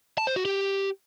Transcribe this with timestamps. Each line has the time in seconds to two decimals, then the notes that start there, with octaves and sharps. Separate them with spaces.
0.18 A5
0.27 C5
0.36 F#4
0.45 G4